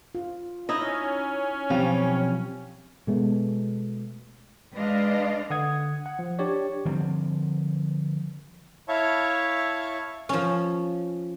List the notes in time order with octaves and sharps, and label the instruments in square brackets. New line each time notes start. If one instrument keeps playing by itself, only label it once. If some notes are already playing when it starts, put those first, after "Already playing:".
[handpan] F4
[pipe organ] C#4 [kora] D#4 E4 D#5
[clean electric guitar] B1 F3 F5 [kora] G3 [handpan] C4
[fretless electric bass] B2 G#3 A3 B3
[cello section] G#3 D4 B4 D5 D#5 F5
[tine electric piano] D3 F#5 D#6 G#6
F#5
F3
D4 G4 C#5 D5
[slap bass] D3 F3 G3 C4
[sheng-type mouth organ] E4 C#5 E5 F5 A5 C#6
[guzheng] F3 C#4